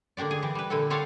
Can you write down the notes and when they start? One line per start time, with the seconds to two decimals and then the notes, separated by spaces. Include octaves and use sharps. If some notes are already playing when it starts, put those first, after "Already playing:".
0.17 D3 A#3 D4 G4 D5
0.31 G#4
0.42 E3 G4
0.55 G3 B4
0.70 A#2 D3 E4 G4 A4
0.90 F4 G4 A4 C#5 F5 F#5